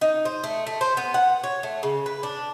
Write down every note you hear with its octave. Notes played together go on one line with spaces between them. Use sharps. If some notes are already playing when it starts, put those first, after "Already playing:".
D#4
C5
A3
A3
C5
B3
F#5
C#5
A3
C#3
B4
D4